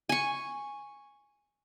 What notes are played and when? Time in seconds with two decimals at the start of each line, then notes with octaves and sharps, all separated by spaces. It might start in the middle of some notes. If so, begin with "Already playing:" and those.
0.09 G#5 C#6